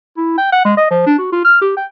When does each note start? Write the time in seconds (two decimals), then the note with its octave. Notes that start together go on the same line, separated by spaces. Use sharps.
0.17 E4
0.38 G5
0.52 F#5
0.65 G#3
0.77 D#5
0.90 F3
1.06 D4
1.18 F#4
1.32 F4
1.45 F6
1.61 G4
1.77 G5